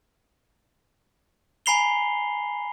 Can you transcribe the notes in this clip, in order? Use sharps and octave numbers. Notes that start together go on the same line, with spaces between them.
G#5 A#5 B5 C7 F7 G7